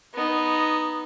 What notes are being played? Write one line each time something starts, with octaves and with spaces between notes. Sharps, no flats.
B3 D#4